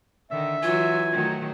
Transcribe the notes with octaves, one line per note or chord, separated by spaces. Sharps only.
D3 D#3 E5
E3 F#3 F4 G#5
D#3 F#3 A3